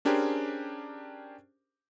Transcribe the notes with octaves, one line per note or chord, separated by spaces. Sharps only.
C#4 D4 G4 G#4 A#4 C5